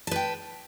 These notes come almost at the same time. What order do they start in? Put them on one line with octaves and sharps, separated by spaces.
A5 B4 G5